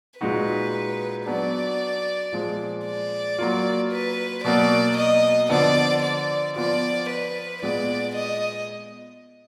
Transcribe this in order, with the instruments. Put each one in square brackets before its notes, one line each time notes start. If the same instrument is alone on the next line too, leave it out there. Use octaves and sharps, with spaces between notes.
[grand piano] A#2 G#3 D#4 F#4 [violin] B4
[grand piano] F#3 B3 D4 [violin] D5
[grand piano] A#2 F3 G#3
[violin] D5
[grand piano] F#3 A#3 F4
[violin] B4
[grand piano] B2 F#3 A#3 [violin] D5
[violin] D#5
[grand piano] D3 F3 B3 [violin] D5
[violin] D5
[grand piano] F3 B3 F4 [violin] D5
[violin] B4
[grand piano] A#2 G#3 B3 [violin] D5
[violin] D#5